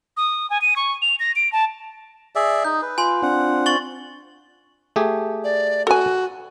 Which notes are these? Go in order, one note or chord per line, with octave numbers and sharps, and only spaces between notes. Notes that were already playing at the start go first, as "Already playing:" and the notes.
D#6
G#5
D#7
C#6
F7
A#6
D7
A5
G#4 D5 E5
D#4 G6
B4
F4 G#5 C6
C4 D4 F4 F#5
C#6 A6 F#7
A3 G4 G#4
D5
F#4 A4 G#5